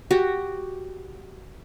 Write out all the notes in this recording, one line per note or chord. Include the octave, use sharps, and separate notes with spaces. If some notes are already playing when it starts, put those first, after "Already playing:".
F#4 G4